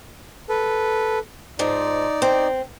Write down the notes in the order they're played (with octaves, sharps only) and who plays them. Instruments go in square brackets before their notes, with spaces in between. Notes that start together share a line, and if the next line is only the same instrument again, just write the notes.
[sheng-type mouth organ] A4 B4
[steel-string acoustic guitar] G#2 F3 [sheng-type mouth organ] D#4 D5
[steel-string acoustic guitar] C4